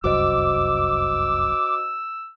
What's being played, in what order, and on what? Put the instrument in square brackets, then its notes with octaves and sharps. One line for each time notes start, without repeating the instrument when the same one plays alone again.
[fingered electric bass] F1 C2 F#2 [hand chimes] F#4 C5 D#5 [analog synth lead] D6 [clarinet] E6